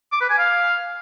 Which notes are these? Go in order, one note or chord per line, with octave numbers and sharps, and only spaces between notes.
D6
B4
G#5
F5